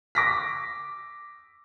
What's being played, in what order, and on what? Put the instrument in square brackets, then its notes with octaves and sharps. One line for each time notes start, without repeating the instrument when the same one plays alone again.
[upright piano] D6 A#6 B6